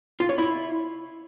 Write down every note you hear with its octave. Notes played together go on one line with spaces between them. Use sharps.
F4
C#5
E4